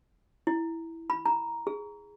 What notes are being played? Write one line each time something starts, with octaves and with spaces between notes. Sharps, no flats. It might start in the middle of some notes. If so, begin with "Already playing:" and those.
E4
B5
A#5
G#4